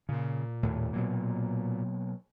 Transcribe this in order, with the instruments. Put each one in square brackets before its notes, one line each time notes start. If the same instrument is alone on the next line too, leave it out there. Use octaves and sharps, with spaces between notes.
[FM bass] A#2 [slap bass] C#3
[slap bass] D#2 A2
B2 F#3 A#3